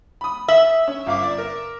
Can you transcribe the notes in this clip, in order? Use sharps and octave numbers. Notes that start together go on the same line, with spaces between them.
B5 D#6
E5 E6 F#7
C#4
G1 F5 D6
D5
A#4